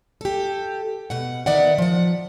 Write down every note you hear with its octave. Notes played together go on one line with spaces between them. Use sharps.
G4 A4
B2 F#5
D#3 B3 D5 E5 F#5
F3 F#5